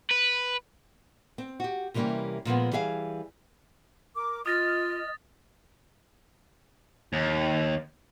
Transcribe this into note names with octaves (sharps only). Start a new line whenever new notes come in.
B4
C4
F#4 G4
C3 E3 G3 A#3 C#4 G4
A#2 F3 G#3 B3
E3 G3 G#4 E5 F5
A#4 D6
F4 D#5 D#6 F6 A6 A#6
D#2